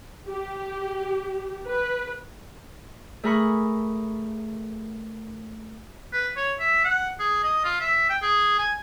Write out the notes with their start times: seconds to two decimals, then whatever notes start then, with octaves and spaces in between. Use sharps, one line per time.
0.28 G4
1.67 B4
3.23 A3 G#4 A#4 B5 C#6
6.12 B4
6.36 C#5
6.59 E5
6.84 F#5
7.19 G#4
7.43 D#5
7.64 F4
7.80 E5
8.09 G5
8.22 G#4
8.59 G#5